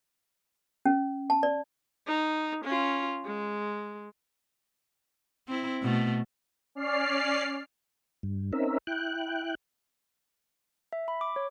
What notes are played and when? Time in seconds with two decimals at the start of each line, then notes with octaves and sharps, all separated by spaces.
0.85 C#4
1.30 A5
1.43 D5
2.07 D#4
2.65 C#4 F4
3.25 G#3
5.48 C4 E4
5.83 B2 A3
6.75 C#4 D5 F6 C7
8.23 G2
8.53 C4 C#4 D#4 A#4 E5
8.87 E4 G5 F#6
10.93 E5
11.08 B5
11.21 D6
11.36 C#5